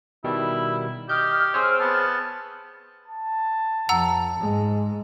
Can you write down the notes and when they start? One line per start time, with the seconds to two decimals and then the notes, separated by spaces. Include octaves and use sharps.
0.24 B2 D#3 G3 E4
1.09 G4 D#5 F6 G6
1.54 C4 G#4 C5 C#5
1.80 B3 A5
3.08 A5
3.89 F2 F#5 A#5 E6
4.40 G#2 G#3